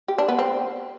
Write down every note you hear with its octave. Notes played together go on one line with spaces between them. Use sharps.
G4
D4
B3
C4